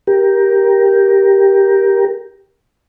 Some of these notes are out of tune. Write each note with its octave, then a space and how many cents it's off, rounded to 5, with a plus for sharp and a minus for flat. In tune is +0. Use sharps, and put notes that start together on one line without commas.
G4 +0 A#4 +10